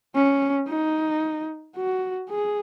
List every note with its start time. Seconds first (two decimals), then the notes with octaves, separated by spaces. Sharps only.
0.15 C#4
0.69 D#4
1.76 F#4
2.30 G#4